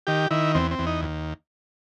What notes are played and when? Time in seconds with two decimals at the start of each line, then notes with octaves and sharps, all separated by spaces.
0.07 D#3 G4
0.31 D#3 E4
0.55 E2 C4
0.71 C4
0.79 E2
0.87 D#4
1.02 D#2